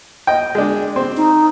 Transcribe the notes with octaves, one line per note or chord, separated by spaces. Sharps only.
D#5 G5
G#3 D4
C4
D#4